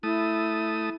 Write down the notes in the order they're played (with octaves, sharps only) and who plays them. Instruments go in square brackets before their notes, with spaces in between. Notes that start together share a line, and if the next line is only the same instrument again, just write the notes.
[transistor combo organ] A3 D#6 [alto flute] E4